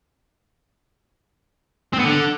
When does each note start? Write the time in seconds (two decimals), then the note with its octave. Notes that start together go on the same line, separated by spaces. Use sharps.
1.93 C4
1.99 B3
2.05 D3